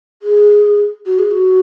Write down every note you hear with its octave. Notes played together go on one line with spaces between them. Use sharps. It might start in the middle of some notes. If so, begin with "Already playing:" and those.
G#4
F#4
G#4
F#4